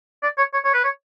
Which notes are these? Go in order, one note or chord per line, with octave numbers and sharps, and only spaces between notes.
D5
C#5
C#5
C#5
B4
C#5